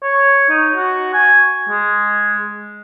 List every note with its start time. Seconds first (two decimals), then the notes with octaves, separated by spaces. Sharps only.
0.03 C#5
0.49 D#4
0.75 F#4
1.13 G#5
1.69 G#3